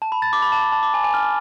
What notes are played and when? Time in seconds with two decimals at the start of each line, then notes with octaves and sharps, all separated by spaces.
0.02 A5
0.12 B5
0.22 A6
0.33 D6
0.42 B5
0.52 A5
0.62 A5
0.72 A5
0.83 D6
0.94 G#5
1.04 G#5
1.14 F6